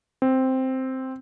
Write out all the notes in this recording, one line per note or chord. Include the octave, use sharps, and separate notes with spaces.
C4